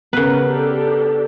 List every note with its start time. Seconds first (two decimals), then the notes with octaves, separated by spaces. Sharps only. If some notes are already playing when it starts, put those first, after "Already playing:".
0.13 C#3 B3 A#4 B4
0.46 D4 G4 A4